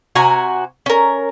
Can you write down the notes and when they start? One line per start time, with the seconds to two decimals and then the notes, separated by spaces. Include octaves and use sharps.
0.15 C3 F#4 G#5 A#5
0.86 C#4 A#4